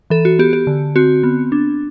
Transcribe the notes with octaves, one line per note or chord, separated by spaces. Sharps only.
E3 A4
F#4
B3 G4
G4
D3
C4 F#4
B3
D4